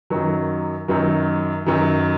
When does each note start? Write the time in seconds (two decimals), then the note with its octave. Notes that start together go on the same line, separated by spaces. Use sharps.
0.10 F#2 D#3 F#3
0.88 F#2 D#3 F#3
1.66 F#2 D#3 F#3